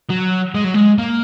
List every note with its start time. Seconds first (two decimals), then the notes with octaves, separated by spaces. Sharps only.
0.09 F#3
0.54 G#3
0.64 F#3
0.74 G#3
0.99 A#3